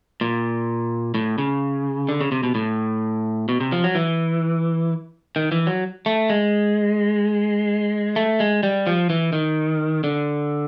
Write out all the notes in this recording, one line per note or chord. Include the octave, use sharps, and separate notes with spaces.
A#2
A2
C#3
D3
C#3
C3
B2
A2
B2
C3
F3
F#3
E3
D#3
E3
F#3
A3
G#3
A3
G#3
G3
F3
E3
D#3
D3